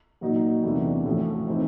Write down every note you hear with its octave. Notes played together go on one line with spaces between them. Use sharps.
A#2 F#3 A#3 D#4 F#4
E2 C3 E3 A3 D4
A2 F3 A3 C#4 F#4
E3 A3 C4 D#4